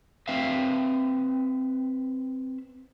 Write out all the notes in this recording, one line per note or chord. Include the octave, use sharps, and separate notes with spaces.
C4 B4 E5 F5